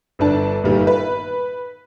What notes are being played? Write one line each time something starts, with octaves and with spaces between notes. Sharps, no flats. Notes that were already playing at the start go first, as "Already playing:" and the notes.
G1 D3 D4 A5
G1 A#2 D#3 G3
B4